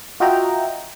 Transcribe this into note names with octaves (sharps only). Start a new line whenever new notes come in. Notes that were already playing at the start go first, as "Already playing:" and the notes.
F4 F#4 D#5 E5 G5 A#5